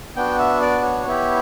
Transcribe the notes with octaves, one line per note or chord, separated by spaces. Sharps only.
B3 D4 F#4 G5
E5
D5
C#5
B3 E4 G4